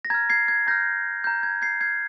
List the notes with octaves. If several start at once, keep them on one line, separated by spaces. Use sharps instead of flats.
A#6
A#5 F6 G#6
G#6 C7
G#6
A#5 F6 G6 A#6
A#5 F6 G6
G#6
G#6 C7
A#5 F6 G#6 C7